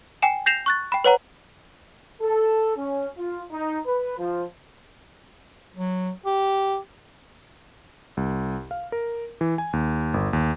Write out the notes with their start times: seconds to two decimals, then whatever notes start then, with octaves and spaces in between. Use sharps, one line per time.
0.22 G5 G#5 E7
0.46 G6 A#6 C7 E7 F7
0.66 C#6 F#6 A6
0.92 G5 B5
1.04 B4 C#5 F#5 A#5
2.22 A4
2.76 C#4
3.17 F4
3.51 D#4
3.86 B4
4.19 F3
5.75 F#3
6.26 G4
8.17 C2
8.71 F5
8.92 A#4
9.41 E3
9.58 G#5
9.73 D#2
10.14 G1
10.33 D#2